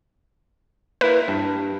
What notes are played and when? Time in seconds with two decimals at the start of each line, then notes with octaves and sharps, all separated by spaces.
1.01 A#3 E4 B4
1.28 G2